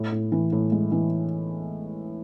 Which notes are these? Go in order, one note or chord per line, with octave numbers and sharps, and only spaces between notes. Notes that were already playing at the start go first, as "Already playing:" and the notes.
Already playing: A2
A2
E3
A2
G#3
E3